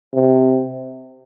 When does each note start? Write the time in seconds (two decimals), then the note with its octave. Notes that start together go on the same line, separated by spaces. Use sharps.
0.14 C3